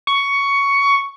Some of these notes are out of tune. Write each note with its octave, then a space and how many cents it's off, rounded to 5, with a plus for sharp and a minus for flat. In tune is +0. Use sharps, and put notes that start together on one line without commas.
C#6 +10